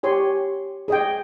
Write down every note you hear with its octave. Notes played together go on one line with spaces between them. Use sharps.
G4 C#5 G#5 C6
G#4 D#5 G5